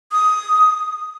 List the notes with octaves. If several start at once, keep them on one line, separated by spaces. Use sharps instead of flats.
D#6